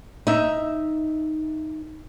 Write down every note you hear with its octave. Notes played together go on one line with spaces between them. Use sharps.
D#4 E5